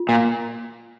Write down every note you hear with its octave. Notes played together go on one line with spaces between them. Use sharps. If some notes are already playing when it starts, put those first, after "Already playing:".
Already playing: F4
A#2